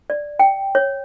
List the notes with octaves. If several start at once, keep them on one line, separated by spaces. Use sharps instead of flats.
D5
G5
C#5